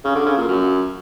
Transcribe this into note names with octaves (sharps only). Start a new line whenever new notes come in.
C#3
D3
C#3
A#2
F#2